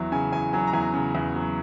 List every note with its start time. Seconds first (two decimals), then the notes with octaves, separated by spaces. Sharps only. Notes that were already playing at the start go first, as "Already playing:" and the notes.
Already playing: E2 F#3 E5
0.12 C#3 G#5
0.32 E2 G#5
0.53 F#3 G#5
0.67 A#5
0.73 E2 G#5
0.94 C#3
1.15 E2
1.35 F#3